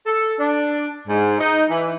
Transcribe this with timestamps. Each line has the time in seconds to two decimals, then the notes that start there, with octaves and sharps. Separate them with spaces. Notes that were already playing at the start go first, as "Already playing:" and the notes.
0.06 A4
0.38 D4
1.06 G#2
1.40 D#4
1.69 E3